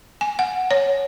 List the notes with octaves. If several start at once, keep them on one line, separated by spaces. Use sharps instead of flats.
G#5
F#5
C#5